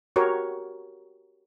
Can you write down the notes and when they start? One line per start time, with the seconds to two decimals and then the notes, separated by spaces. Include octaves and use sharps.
0.16 F#4 G4 A#4 C#5